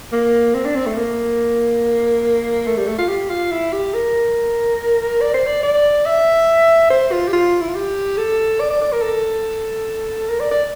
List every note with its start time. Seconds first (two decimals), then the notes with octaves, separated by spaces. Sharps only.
0.12 A#3
0.55 C4
0.65 D4
0.76 C4
0.87 A3
0.97 A#3
2.67 A3
2.77 G3
2.87 A3
2.98 F4
3.09 G4
3.30 F4
3.51 E4
3.73 G4
3.94 A#4
5.21 D5
5.34 C5
5.47 D5
5.63 D5
6.06 E5
6.90 C5
7.12 F4
7.28 G4
7.33 F4
7.61 E4
7.68 F4
7.75 G4
8.18 A4
8.60 D5
8.70 D5
8.82 D5
8.92 A#4
9.02 A4
10.29 A#4
10.40 D5
10.51 D5